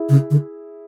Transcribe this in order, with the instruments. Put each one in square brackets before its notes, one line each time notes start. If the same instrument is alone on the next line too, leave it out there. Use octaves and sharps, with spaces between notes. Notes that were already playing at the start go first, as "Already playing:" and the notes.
Already playing: [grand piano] E4 G#4
[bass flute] C#3
D3